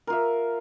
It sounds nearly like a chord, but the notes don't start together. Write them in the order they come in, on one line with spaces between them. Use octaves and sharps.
A#4 F4 E5